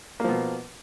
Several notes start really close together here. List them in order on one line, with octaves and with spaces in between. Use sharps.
A#3 F3 B2